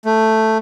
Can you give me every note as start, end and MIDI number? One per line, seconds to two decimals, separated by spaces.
0.05 0.58 57